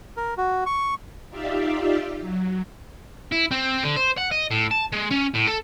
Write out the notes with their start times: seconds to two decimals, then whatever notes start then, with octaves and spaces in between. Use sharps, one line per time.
0.17 A#4
0.38 F#4
0.66 C#6
1.29 D#4 F4 G4 D5 E5 F5
2.20 F#3
3.32 E4
3.51 C4
3.84 D3
3.97 C5
4.18 F#5
4.32 D#5
4.51 A2
4.71 A5
4.93 G#3
5.11 C#4
5.35 A2
5.47 A4